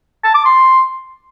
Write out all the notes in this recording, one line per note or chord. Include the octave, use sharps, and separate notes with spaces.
A5
D6
C6